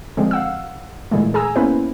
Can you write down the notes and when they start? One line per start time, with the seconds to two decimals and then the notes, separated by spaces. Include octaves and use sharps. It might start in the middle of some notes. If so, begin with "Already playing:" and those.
0.17 D3 F3 G#3 C4
0.31 F5 F#5 E6
1.11 A#2 D3 E3 G#3 A3
1.34 G#4 G#5 A#5 E6
1.56 A#3 B3 C#4 E4 B4 C5